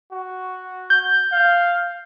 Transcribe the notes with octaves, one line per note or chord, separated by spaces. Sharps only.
F#4
G6
F5